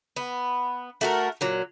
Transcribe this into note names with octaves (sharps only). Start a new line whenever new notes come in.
B3
A3 F#4 A#4
A#2 F#3